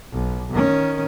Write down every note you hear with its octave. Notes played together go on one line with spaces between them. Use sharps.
B1
D#3 C#4